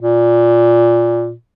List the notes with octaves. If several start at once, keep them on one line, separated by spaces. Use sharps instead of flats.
A#2